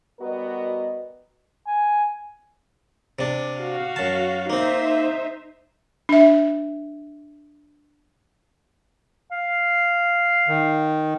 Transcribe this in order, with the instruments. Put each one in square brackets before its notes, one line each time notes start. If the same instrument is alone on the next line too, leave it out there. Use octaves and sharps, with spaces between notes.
[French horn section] G3 B3 F#4 A#4 B4 D#5
[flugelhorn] G#5
[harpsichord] C3 D4
[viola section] F#4 F5
[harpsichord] F#2 A5
[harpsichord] A#3 C4 [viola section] D#4 C5 E5
[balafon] D4 E5
[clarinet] F5
[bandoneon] D#3